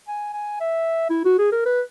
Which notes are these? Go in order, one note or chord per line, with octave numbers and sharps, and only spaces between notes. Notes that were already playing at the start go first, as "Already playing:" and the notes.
G#5
G#5
E5
E4
F#4
G#4
A#4
B4